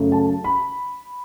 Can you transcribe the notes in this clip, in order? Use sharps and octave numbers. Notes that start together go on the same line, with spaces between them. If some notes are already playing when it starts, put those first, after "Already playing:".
Already playing: F#2 C#3 F#3 A3
A5
B5